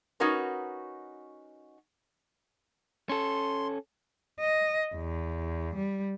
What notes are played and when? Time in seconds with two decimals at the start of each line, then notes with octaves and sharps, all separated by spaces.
0.20 C#4 D#4 F#4 A#4 B4
3.09 C#4 A4 C6
4.40 D#5
4.95 E2
5.76 G3